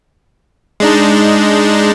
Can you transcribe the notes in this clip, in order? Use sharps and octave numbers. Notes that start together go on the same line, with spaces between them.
G#3 D4 D#4